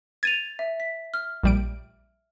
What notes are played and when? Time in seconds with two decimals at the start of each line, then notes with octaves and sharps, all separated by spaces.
0.23 G#6 A6 D#7 F7
0.59 E5
0.80 B6
1.14 F6
1.44 A#1 G3 D7